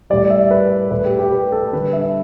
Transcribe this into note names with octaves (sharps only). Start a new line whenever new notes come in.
A2 G3 D5
E5
B4
A2 A3 B4
G4
G4
B4
A4
D3 G3 B4
E5